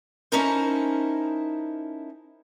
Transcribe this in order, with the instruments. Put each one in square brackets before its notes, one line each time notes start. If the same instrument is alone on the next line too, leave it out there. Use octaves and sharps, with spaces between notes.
[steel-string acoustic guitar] C#4 D#4 E4 A4 A#4 C5